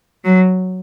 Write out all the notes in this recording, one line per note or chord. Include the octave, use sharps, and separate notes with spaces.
F#3